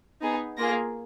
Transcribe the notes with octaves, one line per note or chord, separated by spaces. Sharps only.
B3 D#4 G#4
A#3 F4 G#4 A#6